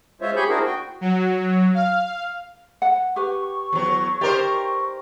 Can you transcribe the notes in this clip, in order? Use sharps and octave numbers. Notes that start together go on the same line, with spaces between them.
G#3 F4 C5 C#5 E5
G4 G#4 G#5 B5 C#6 G6
D4 E4 F#4 G#4 A#4 C5
F#4 G5
F#3
F5
F#5
G4 B4 C#6
E2 F#3
D#4 G4 A#4 C5 D5